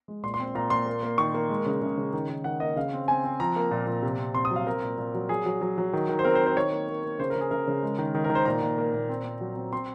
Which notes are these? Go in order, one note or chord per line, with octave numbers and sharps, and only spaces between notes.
G#3
A#2 C6
C6
C4
A#2 A#5
A#2 C6
A#3
A#3
D#3 C#6
A#3
G#3
C#3
C#3
C#3
D#3
D#3
D#3 F#5
A#3 D#5
C#3 F5
C4
C4 G#5
C4
F3 A#5
A#3
A#2
A#2
C3
C4
C4 C6
D#6
F#3 F5
C4 A#4
A#2
A#2
F#3
F#3 G#4
F#3
F#3
F#3
D#3
D#3
C5
C4 A#4
C5
C4
C5
D#3 C#5
A#3
A#3
A#3
C#3 C5
A#4
C#3
G#4
C#3 A#4
C#3
G#3
D#3
D#3
A#4
D#3
C5
A#2 A#5
A#2
A#3
A#2
C4
C4
F#3
C4
C4 C6